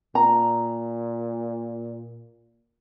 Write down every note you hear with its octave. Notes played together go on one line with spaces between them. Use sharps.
A#2 A#5